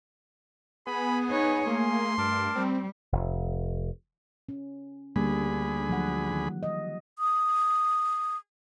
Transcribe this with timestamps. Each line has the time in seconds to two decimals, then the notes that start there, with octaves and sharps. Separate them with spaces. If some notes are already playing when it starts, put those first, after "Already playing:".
0.87 B3 G#4 G#5 B5
1.31 D#4 B4 C#5
1.67 A3 A#3 C6
2.18 G2 A#4 A5 D6
2.56 G3 C4
3.12 F1
4.49 C#4
5.16 D2 D3 G3 A#3 G#4 B5
5.89 F3 F#3 F#5
6.31 D#3
6.63 D#5
7.19 D#6